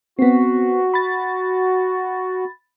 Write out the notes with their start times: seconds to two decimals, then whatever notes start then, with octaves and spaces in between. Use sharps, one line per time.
0.19 B3 C4 F#4
0.94 B5 A6